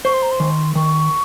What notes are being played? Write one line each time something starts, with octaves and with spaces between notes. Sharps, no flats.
C5 C#6
C6
A#5
C6
D#3
D#3 C#6